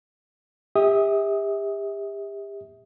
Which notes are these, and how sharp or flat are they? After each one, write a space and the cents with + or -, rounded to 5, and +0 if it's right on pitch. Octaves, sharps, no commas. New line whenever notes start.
G4 +35 E5 -30 D#6 +0